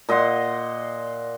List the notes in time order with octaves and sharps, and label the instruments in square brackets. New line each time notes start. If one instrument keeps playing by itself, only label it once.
[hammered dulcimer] A#2 D#5 F#5 C6